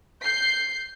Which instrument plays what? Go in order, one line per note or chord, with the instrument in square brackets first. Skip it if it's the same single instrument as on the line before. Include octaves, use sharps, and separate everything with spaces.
[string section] G6 C7